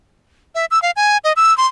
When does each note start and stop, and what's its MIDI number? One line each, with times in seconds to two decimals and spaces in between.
0.55 0.66 76
0.71 0.81 88
0.82 0.91 77
0.96 1.18 80
1.24 1.33 75
1.36 1.56 88
1.58 1.67 84